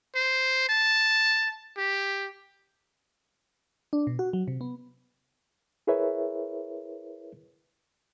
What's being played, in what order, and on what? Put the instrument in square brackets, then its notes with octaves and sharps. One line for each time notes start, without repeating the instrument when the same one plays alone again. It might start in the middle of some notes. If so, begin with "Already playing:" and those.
[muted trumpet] C5
A5
G4
[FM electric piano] D4
B2
F#4
F#3
C3
B3
[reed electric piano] E4 G#4 A#4 B4 C#5 E5